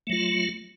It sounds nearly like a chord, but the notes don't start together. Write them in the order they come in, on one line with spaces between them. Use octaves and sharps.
A3 F#3 F4